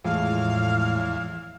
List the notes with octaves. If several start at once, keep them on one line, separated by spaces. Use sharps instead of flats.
E2 A2 F3 G#3 F5